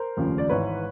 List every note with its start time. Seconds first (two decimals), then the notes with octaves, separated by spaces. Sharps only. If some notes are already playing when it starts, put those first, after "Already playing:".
Already playing: A#4 C5
0.17 F1 D#2 C#3 F3
0.38 D5
0.49 G#1 G#2 E3 B4 C#5